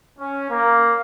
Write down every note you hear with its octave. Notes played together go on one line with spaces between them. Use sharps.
C#4
A#3